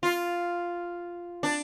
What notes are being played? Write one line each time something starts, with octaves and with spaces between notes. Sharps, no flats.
F4
D4